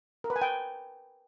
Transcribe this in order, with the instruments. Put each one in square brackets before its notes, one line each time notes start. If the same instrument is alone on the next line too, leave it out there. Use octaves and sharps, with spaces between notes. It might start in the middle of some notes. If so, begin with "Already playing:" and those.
[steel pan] A#4
B4
G#5
G5